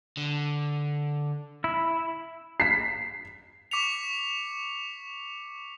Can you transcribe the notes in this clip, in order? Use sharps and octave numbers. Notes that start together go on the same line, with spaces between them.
D3
E4
B6 C7
C#6 D6 B6 C#7 F7